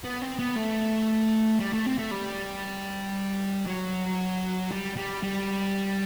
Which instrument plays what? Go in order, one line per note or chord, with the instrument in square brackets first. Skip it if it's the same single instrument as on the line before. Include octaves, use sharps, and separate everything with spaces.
[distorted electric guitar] B3
C4
B3
A3
G3
A3
C4
A3
G3
F#3
G3
G3
G3